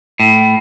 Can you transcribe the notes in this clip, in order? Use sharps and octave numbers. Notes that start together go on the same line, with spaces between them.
A2